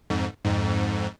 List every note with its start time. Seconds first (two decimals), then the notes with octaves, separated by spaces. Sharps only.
0.10 F2 G#2
0.45 F2 G#2